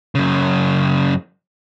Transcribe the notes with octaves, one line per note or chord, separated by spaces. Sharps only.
F#2 C#3